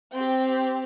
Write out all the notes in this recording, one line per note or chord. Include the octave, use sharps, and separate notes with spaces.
C4 G4 G5